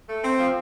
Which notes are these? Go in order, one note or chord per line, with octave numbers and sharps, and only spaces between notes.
A3
C4
F3